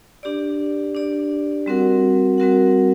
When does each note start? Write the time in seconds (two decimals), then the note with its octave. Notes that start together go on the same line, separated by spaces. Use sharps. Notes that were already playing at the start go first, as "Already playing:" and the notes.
0.23 D4 G4 D5
0.95 D4 G4 D5
1.66 G3 C4 F#4 A#4 F#5
2.38 G3 C4 F#4 A#4 F#5